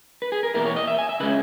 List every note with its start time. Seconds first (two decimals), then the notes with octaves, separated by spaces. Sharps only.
0.22 B4
0.32 G#4
0.43 A#4
0.54 E2 B2 A#3 E4 A#4
0.66 C#5
0.76 D#5
0.88 E5
0.99 G#5
1.09 E5
1.20 C#3 G#3 C#4 B4